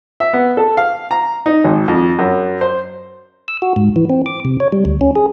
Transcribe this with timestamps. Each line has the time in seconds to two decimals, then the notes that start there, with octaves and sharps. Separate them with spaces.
0.20 E5
0.33 B3
0.57 A4
0.77 F5
1.11 A#5
1.46 D#4
1.64 G#1
1.88 F2
2.19 F#2
2.61 C5
3.48 E6
3.62 F#4
3.76 G#2
3.96 E3
4.10 C4
4.26 D6
4.45 C3
4.60 C#5
4.72 G3
4.85 D2
5.01 C#4
5.16 G#4